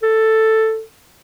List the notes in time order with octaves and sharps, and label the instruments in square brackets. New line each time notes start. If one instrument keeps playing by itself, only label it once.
[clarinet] A4